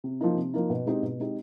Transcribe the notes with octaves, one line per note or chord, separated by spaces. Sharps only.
C3
F3 A#3 D#4
C3
F3 A#3 D#4
B2
G#3 C4 D#4 G4
B2
G#3 C4 D#4 G4